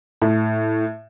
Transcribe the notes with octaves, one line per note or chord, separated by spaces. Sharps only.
A2